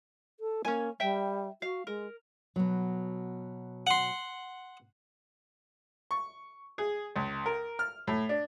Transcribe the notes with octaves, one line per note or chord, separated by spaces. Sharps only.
A4
A#3 C#4 G#5
G3 E5 G5
F#4 F5
G#3 A#4
B2 F#3
F#5 C6
C#6
G#4
C#2
A#4
F6
A2
D4